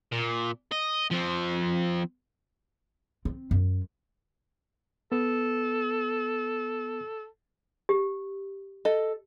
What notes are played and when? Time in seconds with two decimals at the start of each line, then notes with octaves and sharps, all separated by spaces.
0.12 A#2
0.72 D#5
1.11 F3 C4
3.25 C4
3.51 F#2
5.12 B3 A4
7.89 G4
8.85 A4 D#5